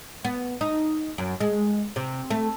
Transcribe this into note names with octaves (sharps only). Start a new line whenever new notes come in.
B3
D#4
F#2
G#3
C3
A3